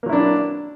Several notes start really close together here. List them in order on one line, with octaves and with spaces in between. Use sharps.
A#3 F#3 E4 D4